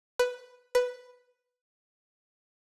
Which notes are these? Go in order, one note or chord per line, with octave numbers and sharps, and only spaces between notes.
B4
B4